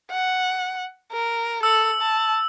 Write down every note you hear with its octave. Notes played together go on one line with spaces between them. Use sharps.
F#5
A#4
A4 E6
A5